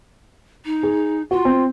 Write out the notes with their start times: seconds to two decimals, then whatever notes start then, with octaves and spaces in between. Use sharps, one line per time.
0.65 D#4
0.83 G#4
1.31 F4 F#4
1.45 C4